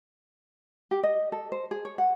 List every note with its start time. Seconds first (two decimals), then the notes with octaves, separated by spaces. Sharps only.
0.91 G4
1.03 D#5
1.32 A4
1.52 C5
1.71 G#4
1.85 C#5
1.98 F#5